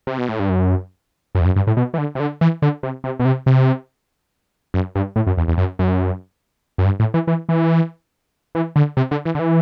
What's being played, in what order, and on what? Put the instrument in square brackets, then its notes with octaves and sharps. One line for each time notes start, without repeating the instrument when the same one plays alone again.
[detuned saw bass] C3
B2
A2
G2
F#2
F#2
E2
F#2
G2
A2
B2
E3
D3
C3
D3
E3
D3
C3
C3
B2
C3
C3
F#2
G2
A2
F#2
E2
E2
F#2
F#2
F#2
G2
A2
E3
E3
E3
E3
D3
C3
D3
E3
D3
E3